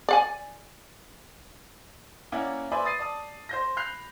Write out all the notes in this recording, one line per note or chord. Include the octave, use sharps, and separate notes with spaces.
D5 F#5 G#5
A#3 C#4 E4 D5 F#5
B4 C5 D5 E5 G#5 B5
D#6 A6 C7 D#7
D5 A5 D#6
C5 G6 A#6
B5 F#6 G6 C7 F7